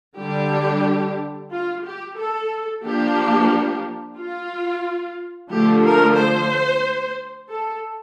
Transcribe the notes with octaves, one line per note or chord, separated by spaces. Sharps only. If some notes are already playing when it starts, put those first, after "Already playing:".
D3 G3 D4 G4
F4
G4
A4
F3 A#3 D4 G4
F4
D3 F3 A3 G4
A#4
C5
A4